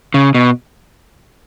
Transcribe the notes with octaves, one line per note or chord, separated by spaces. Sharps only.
C#3
B2